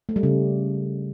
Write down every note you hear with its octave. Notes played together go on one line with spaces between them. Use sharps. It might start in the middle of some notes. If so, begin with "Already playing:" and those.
A3
G3
C#3